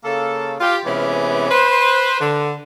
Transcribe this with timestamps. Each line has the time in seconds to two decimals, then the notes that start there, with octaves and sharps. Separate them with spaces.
0.04 C#3 A#3 A4
0.60 F4 G4
0.86 C3 E3 G#3 B3 C#4
1.51 B4 C5
2.20 D3